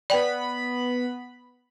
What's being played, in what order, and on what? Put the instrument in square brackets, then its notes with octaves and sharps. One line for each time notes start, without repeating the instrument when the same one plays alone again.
[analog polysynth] B3 B5 [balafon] D5 G5